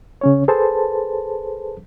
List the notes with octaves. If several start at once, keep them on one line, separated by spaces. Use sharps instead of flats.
C#3 C#4 C#5
G#4 A4 B4 C5 A5